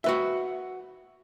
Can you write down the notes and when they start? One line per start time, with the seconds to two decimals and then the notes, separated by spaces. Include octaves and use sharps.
0.04 F#4 B4 E5